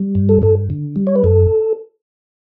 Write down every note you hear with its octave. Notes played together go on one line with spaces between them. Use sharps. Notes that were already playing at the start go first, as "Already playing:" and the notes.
Already playing: G3
G2
A4
G2 A4
D3
G3
C#5
B4
F#2 A4